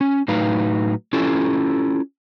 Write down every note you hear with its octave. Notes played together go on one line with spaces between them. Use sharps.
C#4
A2 F#3 D#4 B4 F5
C#4 E4 F4 G4 A4